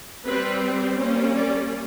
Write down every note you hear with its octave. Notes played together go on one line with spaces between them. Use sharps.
G3 C4 B4
G3 A#3 C#4 C5
D5